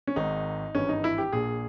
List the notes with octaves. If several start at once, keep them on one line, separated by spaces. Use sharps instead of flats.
C#4
G#1 G#2 D#3 D#4
G#1 G2 E3 C#4
D#4
E4
G4
A#1 A#2 G#4